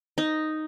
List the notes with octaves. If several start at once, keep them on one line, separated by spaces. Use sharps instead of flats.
D#4